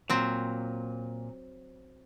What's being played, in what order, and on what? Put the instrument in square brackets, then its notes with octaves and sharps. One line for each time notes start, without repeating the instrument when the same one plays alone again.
[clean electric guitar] A#2 [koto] F#3 C4